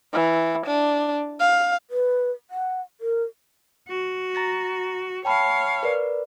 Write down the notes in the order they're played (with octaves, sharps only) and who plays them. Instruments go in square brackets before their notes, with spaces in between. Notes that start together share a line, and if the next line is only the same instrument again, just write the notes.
[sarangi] E3
D4
F5
[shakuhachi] B4
F#5
A#4
[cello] F#4
[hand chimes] A#5 A6 A#6
[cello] C#5 F5 [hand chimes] G5 A5 B5
[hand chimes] A#4 B4 D5